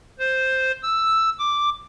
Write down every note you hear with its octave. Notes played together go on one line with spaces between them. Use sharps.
C5
E6
D6